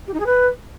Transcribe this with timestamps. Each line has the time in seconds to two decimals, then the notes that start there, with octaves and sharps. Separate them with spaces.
0.07 G4
0.14 D#4
0.20 G#4
0.26 B4